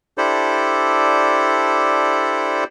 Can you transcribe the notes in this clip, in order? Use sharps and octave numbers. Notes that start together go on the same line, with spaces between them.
D4 E4 G4 A4 C5 D5